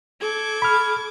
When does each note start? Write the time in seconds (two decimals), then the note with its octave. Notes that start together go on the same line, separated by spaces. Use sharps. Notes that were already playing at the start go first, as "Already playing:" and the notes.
0.21 A4 D6 G#6
0.62 B5 F6